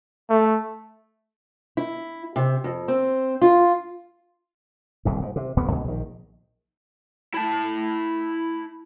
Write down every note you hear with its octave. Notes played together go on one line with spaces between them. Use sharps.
A3
E4
C3
F2
C4
F4
D#1 C2 G#2
G#2
C3
D1 G2 A#2 B3
C#2 B2 D3
A#1 D#3
E4 A5